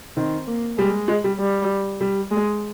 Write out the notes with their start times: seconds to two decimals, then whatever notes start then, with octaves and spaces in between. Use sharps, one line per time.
0.17 D#3 C4
0.47 A#3
0.78 G3 G#3
1.08 G#3
1.24 G3
1.39 G3
2.01 G3
2.31 G#3